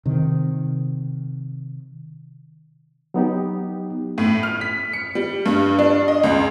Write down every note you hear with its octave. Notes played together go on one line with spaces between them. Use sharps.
C3 D#3
F#3 B3 D#4 G4
A2
F6
B6
C#7
G3
G2
D4
D#5
C#2